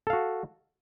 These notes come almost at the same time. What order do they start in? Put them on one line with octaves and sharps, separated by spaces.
A4 F5 F#4